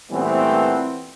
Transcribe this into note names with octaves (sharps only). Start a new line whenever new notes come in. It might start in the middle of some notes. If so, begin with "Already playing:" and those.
A#2 E3 G3 A3 B3 C4